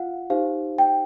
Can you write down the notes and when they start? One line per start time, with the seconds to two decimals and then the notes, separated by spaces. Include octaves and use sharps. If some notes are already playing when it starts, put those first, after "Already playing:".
Already playing: F4 F5 F#5
0.30 D#4 G4 C5 F5
0.78 G5